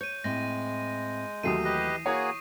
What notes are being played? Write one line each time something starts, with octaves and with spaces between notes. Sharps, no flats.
C#5 G6 D#7
A2 G#3 C4 A#6
D#2 E3 F#3 A3 D#6 C7 D#7
G4 B4 D#5
A#3 F#4 G#4 C#5 C#6